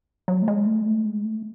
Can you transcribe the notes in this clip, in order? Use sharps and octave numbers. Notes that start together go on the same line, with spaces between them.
F#3
A3
G#3
A3
G#3
A3
G#3
A3